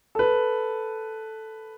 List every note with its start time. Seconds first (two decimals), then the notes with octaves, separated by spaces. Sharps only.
0.15 A4 B4